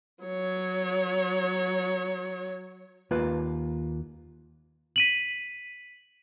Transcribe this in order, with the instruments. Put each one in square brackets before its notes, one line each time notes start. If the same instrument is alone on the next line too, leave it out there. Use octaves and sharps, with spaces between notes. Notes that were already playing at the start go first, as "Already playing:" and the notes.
[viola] F#3 C#5
[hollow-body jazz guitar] D#2 A#3 F4 B4
[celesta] B6 D#7 F#7